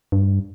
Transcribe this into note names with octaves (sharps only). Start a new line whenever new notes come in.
G2